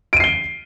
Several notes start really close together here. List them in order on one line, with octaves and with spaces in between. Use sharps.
D7 D#7 C7 G7